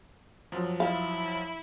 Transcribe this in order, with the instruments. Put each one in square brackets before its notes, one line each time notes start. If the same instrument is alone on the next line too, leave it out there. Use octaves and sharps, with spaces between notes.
[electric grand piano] F#2 F3 F#3
[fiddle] E4 [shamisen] F5